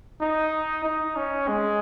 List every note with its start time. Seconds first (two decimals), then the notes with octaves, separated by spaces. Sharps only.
0.22 D#4
0.84 D#4
1.16 C#4
1.48 G#3